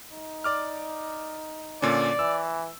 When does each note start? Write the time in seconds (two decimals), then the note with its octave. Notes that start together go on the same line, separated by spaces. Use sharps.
0.10 D#4
0.44 D5 D6 F6
1.82 A#2 D3 C#4 D5
2.19 E3 E6